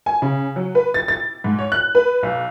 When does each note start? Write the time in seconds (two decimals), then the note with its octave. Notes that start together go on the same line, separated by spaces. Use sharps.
0.06 G#5
0.22 C#3
0.56 F#3
0.75 B4
0.94 A6
1.08 A6
1.44 G#2
1.59 C#5
1.72 F#6
1.95 B4
2.23 B1